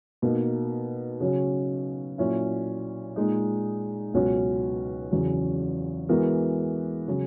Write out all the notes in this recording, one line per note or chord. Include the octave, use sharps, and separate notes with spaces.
B2 A#3 D#4
C#3 F#3 C#4 F#4
A#2 F#3 C#4 E4
A#2 G#3 D#4
C#2 B2 F#3 C#4 F#4
E2 C#3 F#3 C#4
E3 G#3 B3 F#4 A#4
C#3 F#3